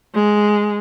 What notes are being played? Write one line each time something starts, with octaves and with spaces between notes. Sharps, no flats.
G#3